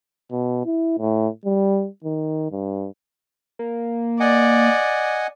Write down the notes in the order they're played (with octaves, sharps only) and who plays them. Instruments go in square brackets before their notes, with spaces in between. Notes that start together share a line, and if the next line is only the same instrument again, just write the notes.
[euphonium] B2
E4
A2
G3
D#3
G2
[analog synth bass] A#3
[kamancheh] D5 [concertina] D#5 F#5 G#5